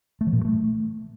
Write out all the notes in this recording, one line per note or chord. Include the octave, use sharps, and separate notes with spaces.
A3
E3
A#2
F#3
A3